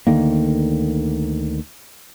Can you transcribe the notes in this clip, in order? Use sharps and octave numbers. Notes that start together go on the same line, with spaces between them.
D2 D3 D#3 A#3